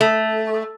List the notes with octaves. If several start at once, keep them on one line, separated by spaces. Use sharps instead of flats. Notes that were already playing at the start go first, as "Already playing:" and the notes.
A3